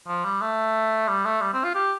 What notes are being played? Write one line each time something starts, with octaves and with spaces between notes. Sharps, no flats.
F3
G3
A3
G3
A3
G3
C4
F4
G4